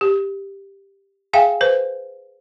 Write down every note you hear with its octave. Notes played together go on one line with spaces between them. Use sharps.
G4
G#4 E5 F5 G5 G#5
B4 C5